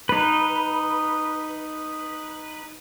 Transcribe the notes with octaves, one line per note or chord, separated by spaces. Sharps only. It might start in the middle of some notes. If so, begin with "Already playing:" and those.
D#4 B4